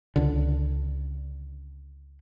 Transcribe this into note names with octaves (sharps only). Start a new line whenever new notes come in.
C#2 D3